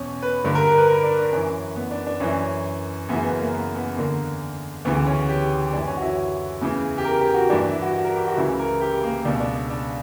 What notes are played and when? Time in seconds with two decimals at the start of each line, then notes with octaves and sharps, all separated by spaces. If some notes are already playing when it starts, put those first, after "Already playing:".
Already playing: E2 B2 C#4
0.22 B4
0.44 G2 D3
0.55 A#4
0.67 A#4
0.78 B4
0.88 A#4
1.03 D4
1.19 D4
1.32 F#2 C#4
1.37 E3
1.76 B3
1.91 D4
2.06 D4
2.20 F#2 E3 C#4
3.09 F#2 C#3 E3 B3
3.23 B3
3.39 A#3
3.54 B3
3.75 B3
3.96 E2 D3 A#3
4.85 D2 C#3 E3 B3
5.07 C#4
5.29 G4
5.73 F#2 E3 D4
5.87 C#4
5.97 F#4
6.02 E4
6.61 E2 C#3 E3
6.98 G4
7.05 A#4
7.20 G4
7.34 F#4
7.49 G2 E3 D4
7.61 D4
7.71 E4
7.82 F#4
7.94 F#4
8.05 A#4
8.16 G4
8.27 F#4
8.37 C#2 C#3 E3 E4
8.59 A#4
8.81 G4
9.04 A#3
9.25 C#2 B2 D4
9.40 D4
9.70 D4